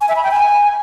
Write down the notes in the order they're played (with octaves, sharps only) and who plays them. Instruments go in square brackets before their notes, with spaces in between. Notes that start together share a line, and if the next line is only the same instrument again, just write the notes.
[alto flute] G#5
E5
B5
G5
G#5